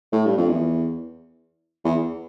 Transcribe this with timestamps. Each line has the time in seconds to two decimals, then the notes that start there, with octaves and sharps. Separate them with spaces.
0.13 A2
0.26 G2
0.37 F2
0.49 E2
1.84 E2